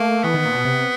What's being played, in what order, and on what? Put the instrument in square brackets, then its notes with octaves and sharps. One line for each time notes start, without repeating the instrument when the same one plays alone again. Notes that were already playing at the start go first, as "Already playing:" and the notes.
Already playing: [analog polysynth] A3 [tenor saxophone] A#3
[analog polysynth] E3 [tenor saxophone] B3
[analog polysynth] D#3
A#2
B2
C3